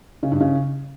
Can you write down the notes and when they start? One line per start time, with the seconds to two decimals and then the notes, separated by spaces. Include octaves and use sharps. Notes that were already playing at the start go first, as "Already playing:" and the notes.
0.23 C#3
0.32 G2
0.41 C#3